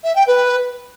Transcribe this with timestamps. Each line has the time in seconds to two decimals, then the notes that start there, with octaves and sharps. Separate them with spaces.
0.04 E5
0.15 G5
0.27 B4